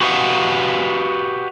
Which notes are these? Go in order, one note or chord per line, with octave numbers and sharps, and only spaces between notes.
F#4 G4 B4 D#5 F5 F#5